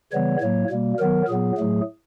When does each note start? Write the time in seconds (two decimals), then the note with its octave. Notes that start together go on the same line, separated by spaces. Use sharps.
0.12 C#3 E3 G3 B3 C#5
0.41 A2 F#3 A#3 C#5
0.70 B2 G3 A#3
0.99 D#3 F#3 B3 A#4
1.28 A#2 F#3 B3 G#4
1.58 A2 F#3 A3